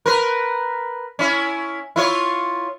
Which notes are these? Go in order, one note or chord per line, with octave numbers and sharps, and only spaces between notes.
A#4 B4
C#4 E4
E4 F4 C#5